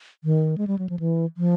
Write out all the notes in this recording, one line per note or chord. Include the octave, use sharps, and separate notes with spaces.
D#3
G#3
G3
F#3
F3
E3
F3